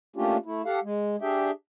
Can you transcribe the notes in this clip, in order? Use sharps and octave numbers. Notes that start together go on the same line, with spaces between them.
A3 A#3 C#4 D4 F4 G4
A3 E4
G4 A4 F5 F#5
G#3
D4 G4 G#4 E5 G5